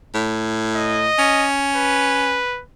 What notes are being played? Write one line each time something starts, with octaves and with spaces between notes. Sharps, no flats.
A2
D#5
C#4
B4